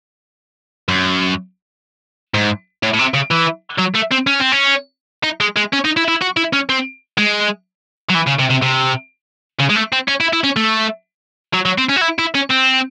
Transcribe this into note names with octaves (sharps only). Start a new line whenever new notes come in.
F#2
G#2
A2
A2
C3
C#3
E3
F#3
A3
C4
C#4
C4
C#4
D#4
G#3
G#3
C#4
D#4
E4
E4
F#4
E4
C#4
C4
G#3
F#3
E3
C#3
C3
C3
C3
C#3
G#3
A3
C4
C#4
E4
E4
C#4
A3
F#3
F#3
C4
C#4
F#4
E4
E4
C#4
C4